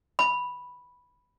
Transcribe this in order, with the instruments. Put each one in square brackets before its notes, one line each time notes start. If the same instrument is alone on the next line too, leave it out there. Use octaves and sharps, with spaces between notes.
[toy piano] B5